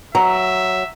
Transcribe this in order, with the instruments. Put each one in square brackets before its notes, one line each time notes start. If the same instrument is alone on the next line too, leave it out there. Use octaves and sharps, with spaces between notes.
[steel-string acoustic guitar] F#3 [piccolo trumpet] E5 [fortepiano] A#5